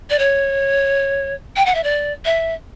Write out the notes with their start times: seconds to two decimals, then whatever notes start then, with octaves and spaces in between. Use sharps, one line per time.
0.10 D5
0.18 C#5
1.56 G5
1.65 F#5
1.74 E5
1.83 D5
2.25 E5